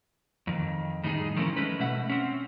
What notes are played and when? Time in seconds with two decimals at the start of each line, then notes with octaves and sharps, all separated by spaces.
0.47 F2 D#3
1.03 A2 D#3 G3 A#3 D#4 G#4
1.36 D#3 F3 A3 C#4 E4 A#4
1.57 G#3 A3 C#4 B4
1.79 B2 A3 E5 F#5
2.09 C4 C#4